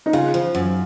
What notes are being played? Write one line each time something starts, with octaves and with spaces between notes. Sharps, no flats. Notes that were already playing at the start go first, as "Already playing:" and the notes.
D#4
C#3 F4
F3
F#2